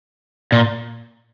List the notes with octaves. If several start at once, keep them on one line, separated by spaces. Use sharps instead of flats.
A#2